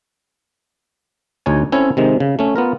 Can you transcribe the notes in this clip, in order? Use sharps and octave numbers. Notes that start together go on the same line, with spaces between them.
D2 D#4 C#5 G#5
C4 C#4 E4 A4 C#5
C3 D#3 G#3
C#3
A3 C#4
B3 F4 A#4